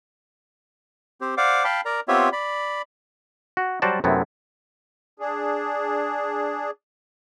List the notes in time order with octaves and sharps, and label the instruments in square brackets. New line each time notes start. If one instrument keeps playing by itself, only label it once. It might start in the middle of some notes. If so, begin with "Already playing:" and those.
[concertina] C4 G4 C5
C5 D5 F5 F#5 D6
F5 G5 A5 B5
A#4 D5 A#5
B3 C4 F4 G4 C#5 E5
D5 B5
[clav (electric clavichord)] F#4
F#3 G3 F#4 C5 D5 A5
F#2 C3 A3 B3 C4 E4
[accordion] D4 G#4